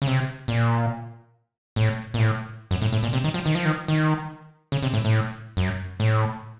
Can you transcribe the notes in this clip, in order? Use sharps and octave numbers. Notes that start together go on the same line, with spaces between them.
C#3
C3
A#2
A2
A#2
A2
F#2
A2
A2
A#2
C3
D#3
F3
D#3
F3
D#3
D#3
C#3
C3
A2
A2
F#2
A2